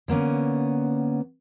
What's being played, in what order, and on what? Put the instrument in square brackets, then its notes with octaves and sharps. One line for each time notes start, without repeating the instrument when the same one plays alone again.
[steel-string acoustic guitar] D3 A#3 B3 C#4